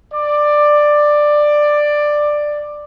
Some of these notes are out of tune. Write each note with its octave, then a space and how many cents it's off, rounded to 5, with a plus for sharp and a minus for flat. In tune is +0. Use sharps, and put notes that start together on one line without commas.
D5 +10